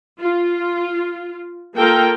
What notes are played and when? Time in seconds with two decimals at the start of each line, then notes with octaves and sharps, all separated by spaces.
0.20 F4
1.75 A#3 F4 A4 A#4 G5